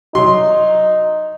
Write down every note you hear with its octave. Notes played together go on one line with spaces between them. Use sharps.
F#3 D#4 C6